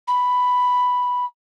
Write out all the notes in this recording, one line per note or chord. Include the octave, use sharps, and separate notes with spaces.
B5